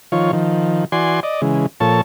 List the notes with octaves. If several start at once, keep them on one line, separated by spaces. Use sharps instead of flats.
D#3 F3 F4 C#5
D#3 F3
E3 F#4 D5 G#5 C6
D5 D#5
C#3 E3 G#3
A#2 F3 A4 C#5 A5